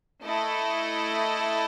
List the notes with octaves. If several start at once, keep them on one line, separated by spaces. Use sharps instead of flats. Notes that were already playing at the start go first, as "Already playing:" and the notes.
A3 E4 A4 D#5